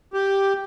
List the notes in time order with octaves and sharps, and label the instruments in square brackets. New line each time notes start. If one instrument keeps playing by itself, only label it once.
[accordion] G4